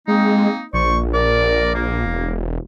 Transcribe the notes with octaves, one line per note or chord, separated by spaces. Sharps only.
G#3 A#3 C4 D#4
A#1 C5 D5 C#6
A#4 D5
A#3
E1